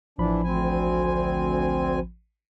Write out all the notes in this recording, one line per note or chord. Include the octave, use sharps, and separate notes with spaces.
A1 E3 F3 D4 B5
D2 C4 G#5